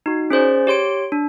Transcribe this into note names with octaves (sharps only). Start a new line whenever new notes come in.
D#4 F#4
C#4 G#4 C5 D5
G4 C#5 C6 D7
D4